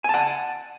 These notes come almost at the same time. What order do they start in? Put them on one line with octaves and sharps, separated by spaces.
G#5 A5 F#5